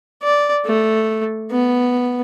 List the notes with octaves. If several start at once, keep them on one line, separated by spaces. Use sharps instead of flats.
D5
A3
B3